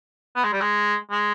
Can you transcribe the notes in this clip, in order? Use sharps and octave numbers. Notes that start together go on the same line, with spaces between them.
B3
G#3
G3
G#3
G#3